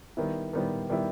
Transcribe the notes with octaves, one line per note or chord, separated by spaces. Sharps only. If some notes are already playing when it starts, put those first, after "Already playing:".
D#3 G3 B3 E4
D#3 G3 B3 E4
D#3 G3 B3 E4